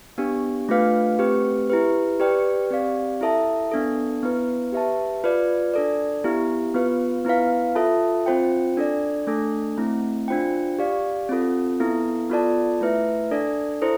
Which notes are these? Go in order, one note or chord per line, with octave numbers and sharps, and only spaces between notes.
B3 D4 G4
A3 D4 F4 B4 F5
A3 C4 G4 B4
E4 G4 B4
G4 B4 D5 G5
C4 G4 D5 F5
E4 A4 E5 A5
B3 D4 A4
B3 E4 B4
G4 B4 E5 A5
F4 B4 D5
D4 A4 D5
B3 E4 G4
B3 F4 B4
B3 E4 B4 F5
F4 A4 E5 A5
C4 F4 C5 G5
D4 A4 D5
A3 D4 A4
A3 C4 E4
D4 F4 C5 G5
G4 D5 F5
C4 F4 A4
B3 E4 A4
B3 F4 A4 D5 A5
A3 E4 B4 E5
D4 A4 D5
E4 A4 C5